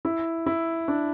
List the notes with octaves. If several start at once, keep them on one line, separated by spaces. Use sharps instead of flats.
E4
E4
D4